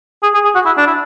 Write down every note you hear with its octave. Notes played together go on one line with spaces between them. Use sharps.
G#4
G#4
G#4
F#4
E4
D4
E4